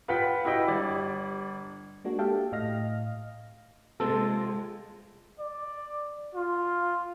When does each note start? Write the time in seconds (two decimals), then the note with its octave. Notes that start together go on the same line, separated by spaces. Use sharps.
0.08 F4 B4 F#5 G5 B6
0.45 E4 F#4 B4 D#5 G5
0.67 G1 D5
2.05 G#3 A#3 D4 F#4
2.19 G4 A4 E5 F5 G5 A5
2.52 A2 D#5 F5 F6 A#6
4.00 C3 G#3 C4 F4 A4
5.39 D5
6.35 F4